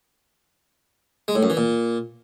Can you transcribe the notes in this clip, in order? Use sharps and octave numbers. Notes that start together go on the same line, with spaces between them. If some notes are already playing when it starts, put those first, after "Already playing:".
G#3
A2
F#2
E3
A#2